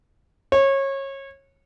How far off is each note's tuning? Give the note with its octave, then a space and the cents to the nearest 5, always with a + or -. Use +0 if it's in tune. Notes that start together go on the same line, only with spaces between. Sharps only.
C#5 -25